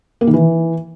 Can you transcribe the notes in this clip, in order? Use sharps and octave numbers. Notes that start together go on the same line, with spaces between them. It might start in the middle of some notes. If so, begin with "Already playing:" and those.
A#3
D#3
E3